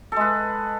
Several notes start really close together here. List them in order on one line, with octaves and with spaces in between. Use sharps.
A4 G#3 B4